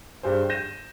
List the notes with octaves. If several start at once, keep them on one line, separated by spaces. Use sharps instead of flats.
G2 G4 G#4 C5
G6 A#6 D#7 E7